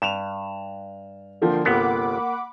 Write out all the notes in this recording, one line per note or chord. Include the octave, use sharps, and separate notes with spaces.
G2 E7 F7
D3 F3 A#3 F5 G5 C6
G1 C3 A#3 B3 F#5 B5 D6